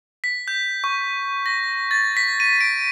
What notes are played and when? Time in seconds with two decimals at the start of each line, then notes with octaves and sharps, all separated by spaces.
0.24 B6
0.48 G6
0.84 C#6
1.46 A#6
1.91 A6
2.17 B6
2.40 D#7
2.61 D7